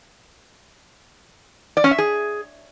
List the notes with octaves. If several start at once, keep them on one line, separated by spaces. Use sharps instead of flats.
D5
C#4
E5
G#4